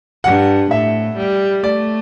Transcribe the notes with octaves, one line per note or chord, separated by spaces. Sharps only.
G2 F#5
A2 E5
G3
A3 D5